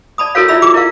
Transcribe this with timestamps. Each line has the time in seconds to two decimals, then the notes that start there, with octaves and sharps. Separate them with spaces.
0.18 D5 A5 B5 D#6
0.35 E4 F#4 A4 A#4 C#5 F5
0.48 E4 F4 D5 E5 B5 E6
0.62 F4 G#4 D6
0.74 E4 A#4 D5 F5